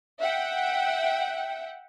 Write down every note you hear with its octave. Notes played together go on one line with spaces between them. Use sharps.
E5 F#5 G5